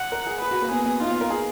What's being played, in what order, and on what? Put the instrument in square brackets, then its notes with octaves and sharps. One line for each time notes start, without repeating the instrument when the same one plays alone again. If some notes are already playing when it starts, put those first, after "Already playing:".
Already playing: [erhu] F#5
[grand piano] A#4
G#4
[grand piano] G#4 [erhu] B4
[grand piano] F#4
A#3
[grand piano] B3 [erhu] G#4
[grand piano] B3
[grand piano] D#4 [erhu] F4
[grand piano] B3
A#4
G#4